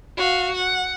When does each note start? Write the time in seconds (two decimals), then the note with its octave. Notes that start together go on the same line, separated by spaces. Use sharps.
0.17 F#4 F5
0.55 F#5